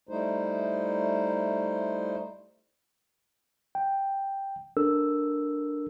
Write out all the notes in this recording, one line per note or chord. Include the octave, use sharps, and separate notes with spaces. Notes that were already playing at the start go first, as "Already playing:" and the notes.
G3 A3 D#4 E4 C5
G5
D4 A4 A#4 E6